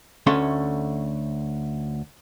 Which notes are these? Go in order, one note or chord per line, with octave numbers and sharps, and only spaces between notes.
D2 A3 C#4 C6